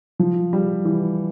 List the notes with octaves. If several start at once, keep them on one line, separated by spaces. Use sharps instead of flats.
F3
G3
E3